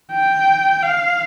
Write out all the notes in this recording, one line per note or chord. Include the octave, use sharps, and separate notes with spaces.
G5
F5